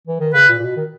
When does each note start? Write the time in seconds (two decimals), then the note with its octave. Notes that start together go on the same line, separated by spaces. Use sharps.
0.07 E3
0.20 D#3
0.34 C#3 B4
0.48 A#2
0.58 A#2
0.62 B2
0.77 D#3